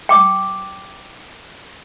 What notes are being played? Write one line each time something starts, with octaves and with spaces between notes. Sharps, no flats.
G5 D6